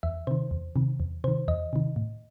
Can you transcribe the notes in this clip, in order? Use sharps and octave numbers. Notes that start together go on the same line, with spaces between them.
E2 E5
C3 D#3 C5
E2
C3 D#3
E2
C3 D#3 C5
E2 D#5
C3 D#3
A2